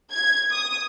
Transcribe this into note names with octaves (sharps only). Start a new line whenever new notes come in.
G#6
D#6